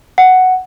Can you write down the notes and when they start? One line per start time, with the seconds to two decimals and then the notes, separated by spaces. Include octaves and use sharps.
0.18 F#5